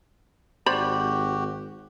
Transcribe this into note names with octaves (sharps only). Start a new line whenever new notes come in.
G#1 F#4 G4 C5 D5 B5